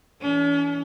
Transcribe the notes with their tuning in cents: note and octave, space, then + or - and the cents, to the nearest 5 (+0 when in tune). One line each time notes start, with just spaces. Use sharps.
E3 -5 C#4 +45 A4 +0